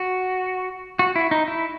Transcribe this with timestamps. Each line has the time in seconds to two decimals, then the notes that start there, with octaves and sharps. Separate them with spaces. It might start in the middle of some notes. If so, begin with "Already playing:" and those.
Already playing: F#4
0.99 F#4
1.16 E4
1.31 D#4
1.48 E4